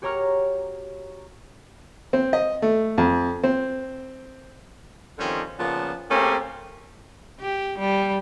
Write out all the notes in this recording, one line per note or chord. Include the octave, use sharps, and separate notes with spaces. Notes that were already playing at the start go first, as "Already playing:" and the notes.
F#4 G4 C#5 A#5 C#6 F6
C4
D#5
A3
F2
C4
D3 D#3 F3 G3 C4 C#4
A#2 C#3 F3 B3 A5
A3 A#3 C4 C#4 G4 G#4
G4
G3